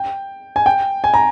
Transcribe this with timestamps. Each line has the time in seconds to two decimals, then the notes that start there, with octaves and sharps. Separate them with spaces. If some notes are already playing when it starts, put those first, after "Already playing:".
Already playing: G5
0.56 G#5
0.66 G5
1.04 G#5
1.14 A#5